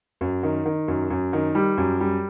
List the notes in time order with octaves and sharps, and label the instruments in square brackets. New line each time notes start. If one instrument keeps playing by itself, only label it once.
[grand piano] F#2
D#3
D#3
F#2
F#2
D#3
G3
F#2
G3